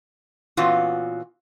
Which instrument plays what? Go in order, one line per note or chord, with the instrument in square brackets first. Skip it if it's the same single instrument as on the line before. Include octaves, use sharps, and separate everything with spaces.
[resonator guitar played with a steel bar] A#2 E3 B3 C#4 F4 F#4